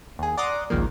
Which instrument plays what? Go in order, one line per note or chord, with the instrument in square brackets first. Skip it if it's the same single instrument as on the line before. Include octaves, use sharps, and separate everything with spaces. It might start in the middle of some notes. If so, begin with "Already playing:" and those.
[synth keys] D#2 G#4
D5 F#5 A#5 C6 D6 D#6
G#1 C#2 D#3 F3 A#3